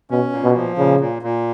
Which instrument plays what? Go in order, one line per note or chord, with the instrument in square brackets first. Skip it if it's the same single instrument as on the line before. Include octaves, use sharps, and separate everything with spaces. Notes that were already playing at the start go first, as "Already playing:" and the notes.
[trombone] B2 [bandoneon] C#4
[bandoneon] A#2
[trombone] B2
[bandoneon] F3
[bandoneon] A#2 [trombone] C#3
[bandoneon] A#2
A#2